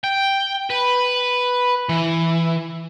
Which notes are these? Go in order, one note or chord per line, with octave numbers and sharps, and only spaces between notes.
G5
B4
E3